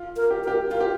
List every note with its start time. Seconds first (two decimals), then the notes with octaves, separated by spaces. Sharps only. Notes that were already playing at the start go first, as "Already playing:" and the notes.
Already playing: F4
0.16 A#4
0.30 G4
0.44 A#4
0.47 G4
0.71 F4 A#4
0.80 G4